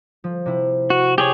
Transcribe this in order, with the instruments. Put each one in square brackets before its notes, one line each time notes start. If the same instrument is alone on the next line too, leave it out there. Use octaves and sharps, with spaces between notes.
[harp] F3
C3 E4
[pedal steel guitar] F#4
G4 G#4 C#5